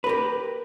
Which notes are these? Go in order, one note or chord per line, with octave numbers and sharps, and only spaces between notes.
G4 A#4 B4